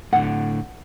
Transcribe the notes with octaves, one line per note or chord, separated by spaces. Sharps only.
A2 D3 F#5